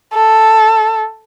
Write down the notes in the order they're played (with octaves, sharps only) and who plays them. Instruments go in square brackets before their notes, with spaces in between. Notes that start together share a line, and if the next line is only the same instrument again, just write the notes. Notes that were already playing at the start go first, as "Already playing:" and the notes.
[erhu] A4